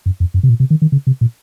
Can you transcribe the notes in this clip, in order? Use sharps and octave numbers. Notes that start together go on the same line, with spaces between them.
F#2
F2
F#2
C3
A#2
C3
D#3
D#3
C#3
C3
A#2